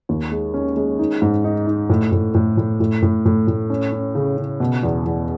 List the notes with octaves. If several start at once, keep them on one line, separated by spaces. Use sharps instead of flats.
D#2
G#3
C#4
G#3
D#4
G#2
D#4
D#4
A2
A2
A2
A2
A2
A2
A2
A2
C#4
C#4
C#3
C#3
B2
E2
E2